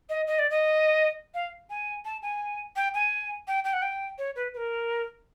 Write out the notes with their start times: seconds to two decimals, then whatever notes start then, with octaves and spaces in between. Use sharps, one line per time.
0.09 D#5
0.27 D#5
0.39 D5
0.51 D#5
1.34 F5
1.70 G#5
2.05 A5
2.22 G#5
2.76 G5
2.94 G#5
3.48 G5
3.65 G5
3.73 F#5
3.82 G5
4.18 C#5
4.36 B4
4.54 B4
4.57 A#4